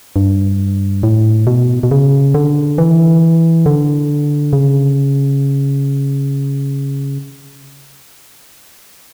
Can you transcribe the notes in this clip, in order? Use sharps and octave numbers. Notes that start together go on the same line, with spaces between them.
G2
A2
B2
B2
C#3
D3
E3
D3
C#3